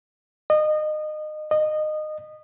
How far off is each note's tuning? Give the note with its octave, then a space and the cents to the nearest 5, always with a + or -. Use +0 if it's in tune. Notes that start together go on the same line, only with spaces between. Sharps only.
D#5 -25
D#5 -20